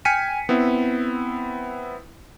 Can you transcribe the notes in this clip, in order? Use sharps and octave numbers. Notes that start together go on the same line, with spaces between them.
G5 G#5 F6 B6 C#7 D#7
B3 C4 E4